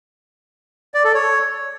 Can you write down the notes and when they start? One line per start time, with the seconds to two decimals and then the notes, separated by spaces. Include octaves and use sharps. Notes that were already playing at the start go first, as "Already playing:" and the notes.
0.94 D5
1.04 A4
1.14 C#5